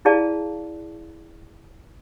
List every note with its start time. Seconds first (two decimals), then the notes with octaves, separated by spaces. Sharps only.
0.05 E4 G#4 D5 F5 A5